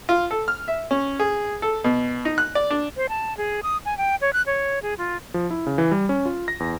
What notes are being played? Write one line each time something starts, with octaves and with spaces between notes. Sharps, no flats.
F4
A4
F6
E5
C#4
G#4
A4
B2
D#4
F#6
D5
D4
C5
A5
G#4
D#6
G#5
G5
C#5
F#6
C#5
G#4
F4
F3
E4
C#3
E3
G3
C#4
F4
A#6
E2